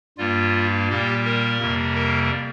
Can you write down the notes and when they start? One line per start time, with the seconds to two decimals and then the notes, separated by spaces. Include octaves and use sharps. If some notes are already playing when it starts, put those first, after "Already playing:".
0.18 G2 G3 A#3 F4
0.89 A#2 G3 A#3 G4
1.25 A#4
1.60 F2 C3 G3 A#3
1.95 A#4